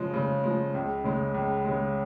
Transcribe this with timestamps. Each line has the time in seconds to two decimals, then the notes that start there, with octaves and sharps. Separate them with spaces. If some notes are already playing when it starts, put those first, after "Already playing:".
Already playing: C#3 F3 G#3
0.14 C#3
0.44 F3 G#3
0.74 C#2
1.04 C#3 G#3
1.34 C#2
1.65 C#3 G#3